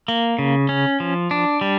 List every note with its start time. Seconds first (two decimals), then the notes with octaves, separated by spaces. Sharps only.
0.08 A#3
0.39 C#3
0.69 C#4
1.00 F3
1.31 D4
1.61 G3